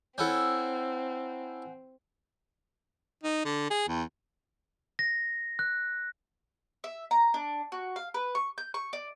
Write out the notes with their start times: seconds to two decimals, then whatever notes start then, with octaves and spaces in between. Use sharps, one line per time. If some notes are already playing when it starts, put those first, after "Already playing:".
0.18 C4 C#4 E4 A4 F#5 G#5 G6
3.23 D#4
3.45 D3
3.70 G#4
3.88 E2
4.99 A#6
5.59 F#6
6.84 E5
7.11 A#5
7.34 D4
7.72 F#4
7.96 F5
8.14 B4
8.35 C#6
8.58 G6
8.74 C#6
8.93 D5